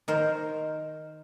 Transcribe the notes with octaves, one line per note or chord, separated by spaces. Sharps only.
D#3 A#4 C5